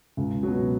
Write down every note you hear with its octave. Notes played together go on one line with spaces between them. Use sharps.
C#2
B2 F#3